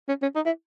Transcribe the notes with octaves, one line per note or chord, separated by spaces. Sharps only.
C#4
C#4
D#4
E4